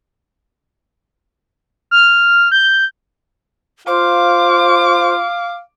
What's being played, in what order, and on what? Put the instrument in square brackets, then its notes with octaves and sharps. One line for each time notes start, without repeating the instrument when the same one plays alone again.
[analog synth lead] F6
G6
[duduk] F4 [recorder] C5 [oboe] F5 [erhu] D6